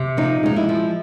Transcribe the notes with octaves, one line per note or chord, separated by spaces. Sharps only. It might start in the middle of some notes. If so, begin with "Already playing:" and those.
Already playing: C3
F3 D#4
G#3 D#4
E4
F3